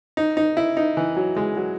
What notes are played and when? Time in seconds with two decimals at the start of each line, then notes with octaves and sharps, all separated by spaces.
0.17 D#4
0.37 D#4
0.57 E4
0.77 D#4
0.97 E3
1.16 F#3
1.36 G#3
1.57 F#3